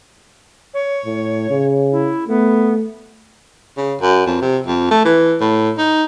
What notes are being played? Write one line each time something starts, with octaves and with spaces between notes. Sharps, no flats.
C#5
A2
C#3
E4
A3 B3
C#3
F#2
F2
C3
F2
A3
E3
A2
D#4